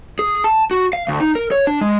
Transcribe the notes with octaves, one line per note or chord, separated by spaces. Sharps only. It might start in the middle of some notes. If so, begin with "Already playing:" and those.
G#4
A5
F#4
F5
D2
D#4
A#4
C#5
D4
G#3